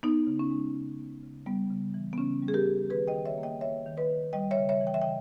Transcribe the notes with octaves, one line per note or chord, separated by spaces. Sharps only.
B3 D#4
C#3
C#4
G#3
C#3
B3
C#3
G3 B3
C#3
E3
B3
C#3 C#4
G3
G#4
G4 A#4
C#3
D#3 G#4 B4
D#5 G5
D#3
C#5 E5
A#3
D#5 G5
A#3 C#5 E5
D#3
B4 D#5
D#3
G3 D#5 G5
C#5 E5
C#3
C#5 E5
E3
G5
E5
C#3 D#5 G5